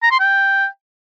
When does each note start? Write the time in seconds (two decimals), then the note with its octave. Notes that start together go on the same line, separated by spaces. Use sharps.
0.03 A#5
0.11 C6
0.20 G5